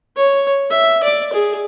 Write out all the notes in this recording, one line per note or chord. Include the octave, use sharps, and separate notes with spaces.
C#5
E5
D5
G#4